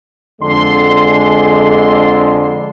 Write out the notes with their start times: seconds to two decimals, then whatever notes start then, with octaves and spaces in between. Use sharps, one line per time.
0.41 F2 D3 G#3 C6